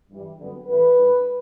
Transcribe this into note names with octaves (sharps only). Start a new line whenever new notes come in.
G2 E3 G3
F#2 D3 G3 B3
A1 A2 E3 A3 B4
A2 G3 D4